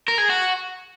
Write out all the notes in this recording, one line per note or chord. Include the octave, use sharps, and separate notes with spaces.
A#4
G#4
F#4